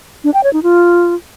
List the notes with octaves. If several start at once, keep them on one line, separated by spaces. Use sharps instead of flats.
D4
G5
C#5
D#4
F4